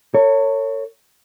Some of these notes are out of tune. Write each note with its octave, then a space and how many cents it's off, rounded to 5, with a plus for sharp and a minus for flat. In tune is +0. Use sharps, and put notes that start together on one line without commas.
A4 +45 C#5 +0